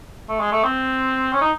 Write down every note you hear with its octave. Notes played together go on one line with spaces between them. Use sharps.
A3
G#3
A3
C4
C#4
D#4